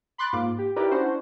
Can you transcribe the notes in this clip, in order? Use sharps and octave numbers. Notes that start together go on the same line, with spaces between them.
B5 C6 D6 F#6 A6
G#2 A#3 F4 D6
G4
D#4 E4 G4 A#4 B4 D5
C#4 D4 E4 F#4 C5